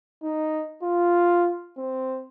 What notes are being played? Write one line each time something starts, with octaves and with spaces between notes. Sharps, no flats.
D#4
F4
C4